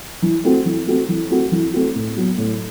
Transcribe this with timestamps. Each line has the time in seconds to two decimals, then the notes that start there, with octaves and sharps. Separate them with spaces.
0.22 E3
0.44 A3 C4 F#4
0.65 E3
0.87 A3 C4 F#4
1.09 E3
1.30 A3 C4 F#4
1.52 E3
1.74 A3 C4 F#4
1.95 A2
2.16 F#3 B3
2.38 A2